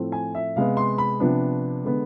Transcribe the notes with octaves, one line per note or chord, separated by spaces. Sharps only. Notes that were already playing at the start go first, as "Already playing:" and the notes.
Already playing: A2 F3 A3 C4
G#5
E5
C3 G#3 B3 F5
C6
B5
C3 F3 B3 D4
D3 G#3 B3